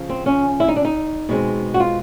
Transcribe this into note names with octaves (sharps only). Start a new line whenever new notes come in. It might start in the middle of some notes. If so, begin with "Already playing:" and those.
Already playing: C#3 F3
C4
C#4
E4
D#4
D4
D#4
B2 G#3 C4
F#4
F4